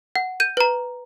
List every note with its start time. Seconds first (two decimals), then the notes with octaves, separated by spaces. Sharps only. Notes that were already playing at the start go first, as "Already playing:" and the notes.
0.16 F#5
0.40 G6 D#7
0.57 B4 A#5